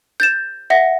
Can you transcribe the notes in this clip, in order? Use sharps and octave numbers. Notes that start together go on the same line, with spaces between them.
G6 A6 E7
E5 F#5 A#6